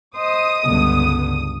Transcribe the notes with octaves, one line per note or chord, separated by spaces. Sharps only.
C5 D#5 D#6
C#2 G2 D3 B3